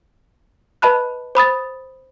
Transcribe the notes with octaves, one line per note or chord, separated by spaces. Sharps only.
B4 D#5 A5 B5 F#6
C5 B5 D#6 A6